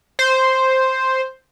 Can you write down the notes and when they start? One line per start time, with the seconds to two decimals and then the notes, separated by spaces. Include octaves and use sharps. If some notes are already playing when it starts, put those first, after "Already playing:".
0.19 C5